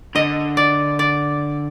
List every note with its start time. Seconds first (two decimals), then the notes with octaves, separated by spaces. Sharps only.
0.15 D3 D#5
0.57 D5
0.99 D5